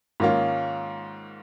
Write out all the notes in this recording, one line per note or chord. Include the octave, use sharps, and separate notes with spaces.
G#2 D#3 A#3 C#4 F4